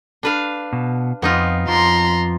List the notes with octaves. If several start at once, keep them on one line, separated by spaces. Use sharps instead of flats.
D4 B4 F5
B2
F2 B3 D#4 F4
F2 F3 A#5 C6